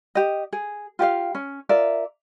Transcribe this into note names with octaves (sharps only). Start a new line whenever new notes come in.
G4 D#5
G#4
F4 G4 D5 F5
C#4
F4 A#4 D5 E5